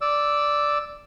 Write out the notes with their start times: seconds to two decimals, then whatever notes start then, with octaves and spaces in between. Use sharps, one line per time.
0.01 D5 E6